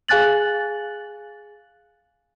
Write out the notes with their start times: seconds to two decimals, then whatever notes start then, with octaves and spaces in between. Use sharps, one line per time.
0.08 G#4 F5 G#5 F#6 A6 F#7